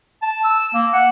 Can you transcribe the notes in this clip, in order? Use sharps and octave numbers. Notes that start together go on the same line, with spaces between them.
A5
E6
A#3
F#5